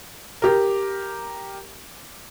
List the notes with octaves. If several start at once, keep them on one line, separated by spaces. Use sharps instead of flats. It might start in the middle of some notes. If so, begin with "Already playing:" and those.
G4 A#4